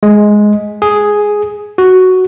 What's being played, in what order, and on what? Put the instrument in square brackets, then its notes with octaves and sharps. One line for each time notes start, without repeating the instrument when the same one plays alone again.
[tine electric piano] G#3
G#4
F#4